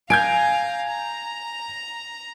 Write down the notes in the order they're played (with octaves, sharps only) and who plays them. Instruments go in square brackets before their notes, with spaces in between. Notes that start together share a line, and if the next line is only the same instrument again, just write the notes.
[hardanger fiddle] F5 A#5 [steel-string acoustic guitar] G#5 [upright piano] G6 G#6 D7
[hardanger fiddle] A#5